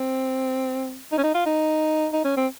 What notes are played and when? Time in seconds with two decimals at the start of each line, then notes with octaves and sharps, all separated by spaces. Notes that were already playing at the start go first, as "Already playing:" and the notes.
Already playing: C4
1.12 D#4
1.18 C#4
1.24 D#4
1.34 F4
1.46 D#4
2.13 D#4
2.24 C#4
2.37 C4